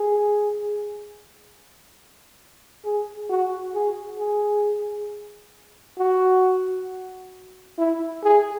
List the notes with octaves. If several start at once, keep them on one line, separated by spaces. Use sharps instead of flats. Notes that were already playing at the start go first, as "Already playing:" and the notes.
Already playing: G#4
G#4
F#4
G#4
G#4
F#4
E4
G#4